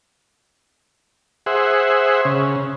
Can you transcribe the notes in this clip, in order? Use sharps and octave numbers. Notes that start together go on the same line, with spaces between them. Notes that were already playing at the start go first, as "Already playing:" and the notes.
G#4 C5 E5 F#5
C#3